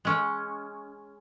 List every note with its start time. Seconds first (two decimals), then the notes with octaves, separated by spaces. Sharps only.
0.05 G#3 C#4